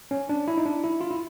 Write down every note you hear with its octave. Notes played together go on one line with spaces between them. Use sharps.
C#4
D4
E4
D#4
D4
E4
F4
E4